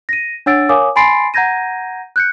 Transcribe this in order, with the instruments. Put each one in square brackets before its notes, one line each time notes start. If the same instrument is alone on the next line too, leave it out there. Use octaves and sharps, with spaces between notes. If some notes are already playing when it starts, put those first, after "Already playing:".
[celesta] A#6 D#7
D4 C#5 F#5 E6 A6 D7
A#4 C#5 F5 G#5 D6 D#6
G#5 B5 C6 A6 C7 D7
F#5 A#5 G6 G#6 A#6 D#7
F#6 G6 C#7